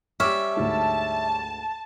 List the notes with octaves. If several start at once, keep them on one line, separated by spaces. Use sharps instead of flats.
G3 C#4 E5 D6 E6 F6
D2 G#2 A5